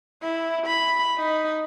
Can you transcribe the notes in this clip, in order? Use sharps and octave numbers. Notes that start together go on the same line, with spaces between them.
E4
B5
D#4